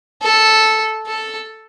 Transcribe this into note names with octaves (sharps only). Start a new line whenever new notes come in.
A4
A4